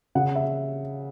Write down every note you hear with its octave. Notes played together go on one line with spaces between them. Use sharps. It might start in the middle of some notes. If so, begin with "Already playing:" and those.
C#3 F#5
E5